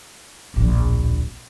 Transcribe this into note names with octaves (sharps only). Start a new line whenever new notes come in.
D1 A#1